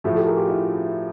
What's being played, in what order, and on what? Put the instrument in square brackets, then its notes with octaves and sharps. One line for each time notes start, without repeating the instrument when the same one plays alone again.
[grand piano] A2 F3 A3 [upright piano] F#4 G#4
[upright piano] G4 A4
G#4 A#4
F4 G4
E4 F#4